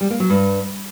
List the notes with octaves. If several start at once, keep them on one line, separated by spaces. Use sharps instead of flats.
G3
A#3
F#3
G2